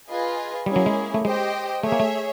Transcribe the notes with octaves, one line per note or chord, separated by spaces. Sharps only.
F4 G#4 B4 D#5 G#5
G3 A#3 C#4 E4 G#4
F#3
G#3
A3
G#3 G4 C5 D#5 G5
A3 G#4 C#5 E5
A#3
A3